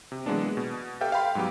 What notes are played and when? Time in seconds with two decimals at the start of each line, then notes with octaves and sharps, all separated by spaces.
0.12 C3
0.26 E3 F#3 G#3 A#3 B3 D4
0.57 B2
1.01 G4 A4 B4 E5 F5 G5
1.12 F5 G5 B5 C6
1.35 G#2 F#3 G3 B3 G4